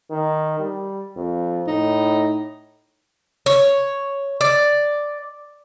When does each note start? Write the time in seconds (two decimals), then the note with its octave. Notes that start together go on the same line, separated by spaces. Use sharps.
0.10 D#3
0.59 G3
1.16 F2
1.67 A2 D#4
3.46 C#5
4.41 D5